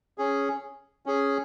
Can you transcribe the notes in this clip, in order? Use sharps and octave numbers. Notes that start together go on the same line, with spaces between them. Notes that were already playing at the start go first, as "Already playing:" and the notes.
C#4 G#4
C#4 G#4